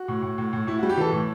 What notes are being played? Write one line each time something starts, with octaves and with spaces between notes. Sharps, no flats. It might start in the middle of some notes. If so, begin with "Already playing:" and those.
Already playing: F#4
A2
A2
A2
A2
A2 E4
F#4
G3
G4
E3 A4
A2